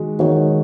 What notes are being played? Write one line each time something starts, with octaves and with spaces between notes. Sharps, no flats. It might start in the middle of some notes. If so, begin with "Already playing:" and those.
Already playing: D#3 G#3 F#4
D#3 G#3 D#4 F#4 C#5